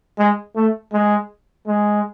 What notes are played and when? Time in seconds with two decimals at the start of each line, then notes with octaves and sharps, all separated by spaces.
0.18 G#3
0.55 A3
0.92 G#3
1.67 G#3